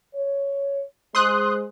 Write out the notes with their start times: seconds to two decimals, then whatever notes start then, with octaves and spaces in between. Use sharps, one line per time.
0.13 C#5
1.15 G#3 C5 C6 D#6 F#6